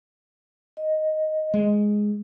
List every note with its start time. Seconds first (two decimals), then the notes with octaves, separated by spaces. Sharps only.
0.77 D#5
1.54 G#3